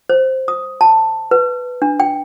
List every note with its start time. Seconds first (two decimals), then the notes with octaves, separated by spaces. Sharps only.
0.10 C5
0.48 D#6
0.81 A5
1.31 B4
1.82 D4
2.00 G5